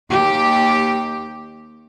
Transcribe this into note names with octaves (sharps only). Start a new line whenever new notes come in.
D#2 G4